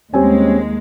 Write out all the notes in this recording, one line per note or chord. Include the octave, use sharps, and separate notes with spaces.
D#2 G3 G#3 C4 C#4 G#5